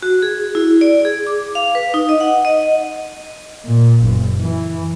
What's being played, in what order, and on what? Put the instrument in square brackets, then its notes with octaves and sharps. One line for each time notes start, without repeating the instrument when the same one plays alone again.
[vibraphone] F#4
G#4
E4
D5
G#4
D6
F5
B4
D#4
D#5
F#5
D#5
[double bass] A#2
F#1
E3